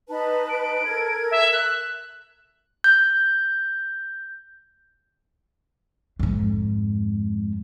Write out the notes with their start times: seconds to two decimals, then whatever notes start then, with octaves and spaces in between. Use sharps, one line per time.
0.09 D#4 B4 A5
0.50 D7
0.85 A4 A#4 G#6
1.31 E5
1.53 F#6
2.84 G6
6.19 F2 G#2